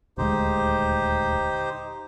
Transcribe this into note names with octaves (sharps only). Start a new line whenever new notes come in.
D#1 D2 G#3 D#4 G4 C5